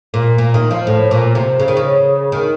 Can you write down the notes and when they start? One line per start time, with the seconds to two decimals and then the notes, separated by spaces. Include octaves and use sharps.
0.14 A#2
0.38 A#2
0.54 D#3
0.71 F3
0.87 A2
1.11 A#2
1.35 C3
1.60 C#3
1.68 D#3
1.77 C#3
2.32 D#3